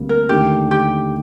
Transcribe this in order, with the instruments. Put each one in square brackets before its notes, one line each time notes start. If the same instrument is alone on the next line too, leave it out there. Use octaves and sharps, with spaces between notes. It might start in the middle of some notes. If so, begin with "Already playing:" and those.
Already playing: [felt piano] D2 C3 G3 A#3
[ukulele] A#4
[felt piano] D#2 D3 A3 D#4 [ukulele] G4
[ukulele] G4